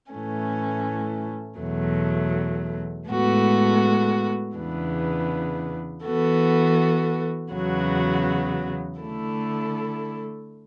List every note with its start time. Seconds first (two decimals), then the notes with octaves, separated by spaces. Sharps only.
0.11 A2 E3 A3 C#4
1.59 E2 B2 F#3 A3
3.07 A2 G#3 B3 F#4 A4
4.55 E2 C#3 E3 B3 D4
6.03 E3 B3 F#4 A4
7.52 E2 C#3 F#3 B3 F#4
9.00 D3 A3 E4 A4